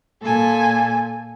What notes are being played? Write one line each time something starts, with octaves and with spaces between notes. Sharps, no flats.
A#2 A4 G#5